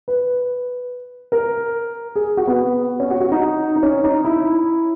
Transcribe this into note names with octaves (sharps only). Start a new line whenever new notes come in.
B4
A#4
G#4
F#4
B3
C#4
F#4
F#4
D#4
D#4
C#4
D#4
E4